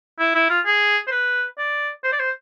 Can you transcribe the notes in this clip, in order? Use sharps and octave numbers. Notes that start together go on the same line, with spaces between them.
E4
E4
F4
G#4
C5
B4
D5
C5
D5
C5